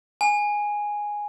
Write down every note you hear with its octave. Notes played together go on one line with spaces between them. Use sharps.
G#5